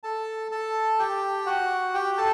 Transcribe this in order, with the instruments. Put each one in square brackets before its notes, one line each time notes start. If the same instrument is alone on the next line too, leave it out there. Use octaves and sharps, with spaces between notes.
[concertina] A4 A5
A4 A5
G4 G5
F#4 F#5
G4 G5
A4 A5